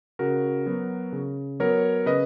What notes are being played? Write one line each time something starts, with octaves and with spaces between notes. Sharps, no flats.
C#3 F#4 A#4
F#3 B3
C#3
F#3 B3 A#4 C#5
C#3 B4 D#5